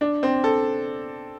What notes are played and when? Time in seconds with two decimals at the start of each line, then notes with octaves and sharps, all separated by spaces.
0.01 D4
0.23 C4
0.44 A4